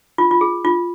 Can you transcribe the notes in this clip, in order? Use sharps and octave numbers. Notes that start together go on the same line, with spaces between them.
F4
F4
G#4
F4